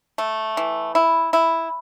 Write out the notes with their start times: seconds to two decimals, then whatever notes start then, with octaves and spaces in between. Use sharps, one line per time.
0.18 A3
0.57 E3
0.95 E4
1.33 E4